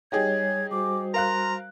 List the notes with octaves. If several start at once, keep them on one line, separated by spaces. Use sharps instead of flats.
G3 D#4 G4 G#4 C#5 G#6
G3 F#4 C5 D6
A#4 F5 A#5 C6 F#6